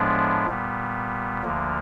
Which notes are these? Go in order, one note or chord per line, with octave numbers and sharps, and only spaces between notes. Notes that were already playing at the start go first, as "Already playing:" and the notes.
Already playing: A2 F3 G#3 B3 D4
A#2 G3 B3
D2 D3 F3 A#3